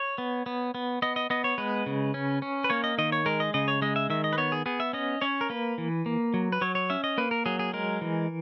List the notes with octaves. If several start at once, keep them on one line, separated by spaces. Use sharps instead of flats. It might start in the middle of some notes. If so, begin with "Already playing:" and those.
Already playing: C#5
B3
B3
B3
B3 D#5
D#5
B3 D#5
C#5
G#3 B4
C#3
C#4
C#4
B4
A#3 C#5
D#5
D#3 D#5
C#5
G#3 A#4
D#5
C#3 D#5
C#5
G#3 D#5
E5
D#3 E5
D#5
B4
B3 C#5
G#4
B3 G#4
E5
C#4 D#5
C#4 C#5
A#4
A#3 B4
E3
A#3
F#3
B4
F#3 C#5
C#5
C#4 E5
D#5
A#3 B4
A#4
F#3 G#4
G#4
G#3 A#4
E3